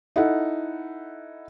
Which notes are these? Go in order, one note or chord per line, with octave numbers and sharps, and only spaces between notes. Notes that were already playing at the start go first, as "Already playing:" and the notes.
D#4 E4 A4 F#5